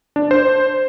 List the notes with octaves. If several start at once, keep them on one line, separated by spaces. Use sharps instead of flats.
D4
C5